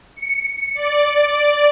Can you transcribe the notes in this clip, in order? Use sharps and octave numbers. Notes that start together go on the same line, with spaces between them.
C#7
D5